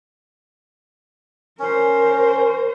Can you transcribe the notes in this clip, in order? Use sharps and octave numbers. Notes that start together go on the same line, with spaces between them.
C#4 A#4 C5